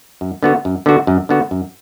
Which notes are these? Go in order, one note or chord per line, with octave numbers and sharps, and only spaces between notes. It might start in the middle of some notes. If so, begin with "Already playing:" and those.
F#2
D3 B3 F#4
F#2
D3 B3 F#4
F#2
D3 B3 F#4
F#2